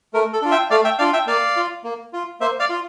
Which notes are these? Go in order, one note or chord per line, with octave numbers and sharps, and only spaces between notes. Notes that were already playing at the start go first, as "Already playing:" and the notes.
A3 A#4
A4
D4 F4
E5 G5
A3 D5 F5
E5 G5
D4 F4 D5 F5
E5 G5
A#3 D5 F5
F4
A#3
F4
A#3 C5 E5
D5 F5
F4